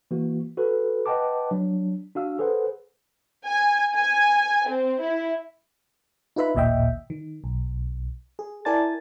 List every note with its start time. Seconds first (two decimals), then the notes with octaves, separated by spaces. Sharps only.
0.11 E3 A#3 F#4
0.57 F#4 A4 B4
1.06 B4 D#5 F#5 G5 A5 D6
1.51 F#3 D4
2.15 D4 F#4 F5 E6
2.39 G#4 A4 B4 C5 F#5
3.45 G#5
3.94 G#5
4.67 C4
5.01 E4
6.36 D#4 F4 B4 E5 B5
6.55 A1 D#2 A#2 D#5 E5 G5
7.10 D#3
7.44 B1
8.39 G#4
8.65 E4 A#4 D5 G#5 A5 A6